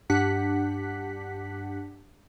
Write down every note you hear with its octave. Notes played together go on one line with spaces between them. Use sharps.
G2 D4 G4 F#5 F#6 B6